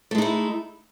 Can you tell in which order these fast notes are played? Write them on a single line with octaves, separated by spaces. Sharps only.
A3 G#3 D#4 E4